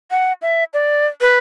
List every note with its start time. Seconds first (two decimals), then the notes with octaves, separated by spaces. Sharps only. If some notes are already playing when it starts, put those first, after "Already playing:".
0.11 F#5
0.42 E5
0.74 D5
1.21 B4